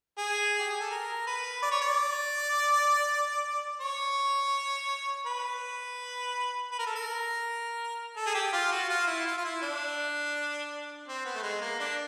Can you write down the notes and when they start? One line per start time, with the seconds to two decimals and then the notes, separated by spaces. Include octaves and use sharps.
0.18 G#4
0.59 G4
0.70 G#4
0.80 A4
0.91 A#4
1.27 B4
1.63 D5
1.72 C#5
1.82 D5
3.81 C#5
5.26 B4
6.71 B4
6.79 A#4
6.87 A4
6.95 A#4
8.17 A4
8.27 G#4
8.34 G4
8.53 F4
8.72 F#4
8.89 F4
9.07 E4
9.26 F4
9.38 F4
9.44 E4
9.62 D4
11.08 C4
11.25 B3
11.35 A3
11.43 G#3
11.62 A#3
11.80 D4